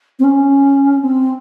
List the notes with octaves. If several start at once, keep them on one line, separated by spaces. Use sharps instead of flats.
C4
C#4
C4